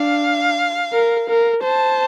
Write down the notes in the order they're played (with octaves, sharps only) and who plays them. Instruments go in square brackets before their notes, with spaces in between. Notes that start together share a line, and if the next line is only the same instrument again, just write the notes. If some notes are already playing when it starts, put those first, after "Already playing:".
Already playing: [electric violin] D4 [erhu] F5
[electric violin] A#4
A#4
[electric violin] C5 [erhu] A5